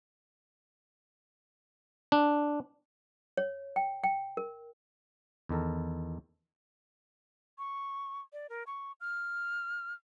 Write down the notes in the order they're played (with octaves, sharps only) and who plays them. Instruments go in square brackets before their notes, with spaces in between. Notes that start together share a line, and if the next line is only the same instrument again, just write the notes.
[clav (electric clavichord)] D4
[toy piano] C#5
G5
G5
A#4
[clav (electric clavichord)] E2 D#3 A4 A#4
[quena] C#6
D5
A#4
C#6
F6